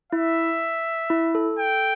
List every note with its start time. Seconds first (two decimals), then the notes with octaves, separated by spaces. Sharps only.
0.12 E4 E5
1.10 E4
1.35 A4
1.59 G5